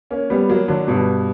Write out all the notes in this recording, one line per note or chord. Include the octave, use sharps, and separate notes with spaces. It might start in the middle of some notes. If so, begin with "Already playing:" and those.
A#3 C#4
G3 B3
F#3 A#3
D3 F#3
G2 B2